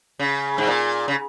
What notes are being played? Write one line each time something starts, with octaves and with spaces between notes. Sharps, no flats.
C#3
G#2
A#2
C#3